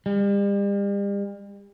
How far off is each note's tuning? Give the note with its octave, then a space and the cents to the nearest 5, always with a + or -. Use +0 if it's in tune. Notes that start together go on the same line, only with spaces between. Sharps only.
G3 +40